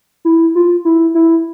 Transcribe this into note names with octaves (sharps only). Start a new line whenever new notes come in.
E4
F4
E4
E4